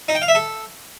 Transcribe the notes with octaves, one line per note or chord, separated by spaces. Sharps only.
D#4
G5
F5
E5
A4